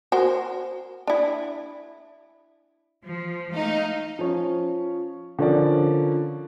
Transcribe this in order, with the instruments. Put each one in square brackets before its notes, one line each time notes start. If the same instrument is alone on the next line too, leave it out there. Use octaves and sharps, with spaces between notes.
[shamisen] F#4 A#4 C5
D4 E4
[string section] F3
A3 D#4 F5
[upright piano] F3 C#4
D3 F3 C#4 A#4 D5